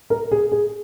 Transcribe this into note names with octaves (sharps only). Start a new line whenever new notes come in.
A#4
G#4
G#4